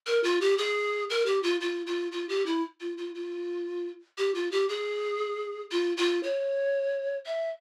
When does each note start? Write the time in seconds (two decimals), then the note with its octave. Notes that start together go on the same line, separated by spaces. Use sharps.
0.07 A#4
0.24 F4
0.41 G4
0.58 G#4
1.10 A#4
1.26 G4
1.43 F4
1.61 F4
1.87 F4
2.12 F4
2.29 G4
2.46 E4
2.81 F4
2.98 F4
3.15 F4
4.18 G4
4.35 F4
4.52 G4
4.69 G#4
5.72 F4
5.97 F4
6.23 C#5
7.26 E5